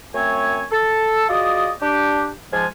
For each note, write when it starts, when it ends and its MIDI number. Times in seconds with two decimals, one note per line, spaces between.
0.15 0.64 42
0.15 0.64 57
0.15 0.64 60
0.15 0.64 73
0.15 0.64 80
0.72 1.25 69
1.29 1.71 65
1.29 1.71 66
1.29 1.71 68
1.29 1.71 74
1.29 1.71 75
1.82 2.28 62
1.82 2.28 67
2.52 2.66 44
2.52 2.66 53
2.52 2.66 56
2.52 2.66 65
2.52 2.66 80